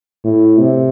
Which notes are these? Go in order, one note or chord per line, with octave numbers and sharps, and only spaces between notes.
A2
C3